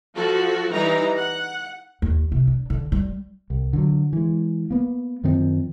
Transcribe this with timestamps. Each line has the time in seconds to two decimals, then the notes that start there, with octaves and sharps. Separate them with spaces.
0.15 F3 F#4 A4
0.72 E3 G3 D#4 A#5
1.16 F#5
2.02 D#2
2.32 C3
2.47 D4
2.70 D3
2.92 G3
3.50 C2
3.73 D3 D#3 F#3
4.13 E3 G#3
4.71 A#3 B3
5.24 F#2 D#3 F3 C4